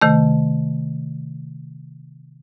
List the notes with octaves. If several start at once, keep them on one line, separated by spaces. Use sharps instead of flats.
C3 D#3 A3